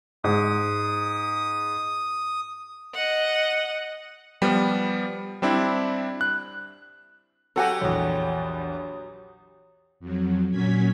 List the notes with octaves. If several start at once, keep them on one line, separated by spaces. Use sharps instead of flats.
G#2 D#6
D#5 F#5
F3 G3 B3
G3 C4 D4 E4
F#6
F#3 F#4 G4 A4 F#5 G#5
A#1 E2 C#5 D#6
F2 F#3
A#2 F#3 C#4 G#6 B6